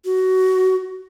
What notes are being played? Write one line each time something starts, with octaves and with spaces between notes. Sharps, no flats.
F#4